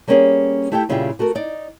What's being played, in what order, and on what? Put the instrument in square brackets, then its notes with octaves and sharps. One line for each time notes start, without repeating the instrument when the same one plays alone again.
[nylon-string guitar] G3 A#3 B3 C#4 G4 G#4
A3 E4 G4 A4 C#5 G5
A#2 C#3 G3 E4 F4 G4
A3 F#4 A4 A#4
D#4 D5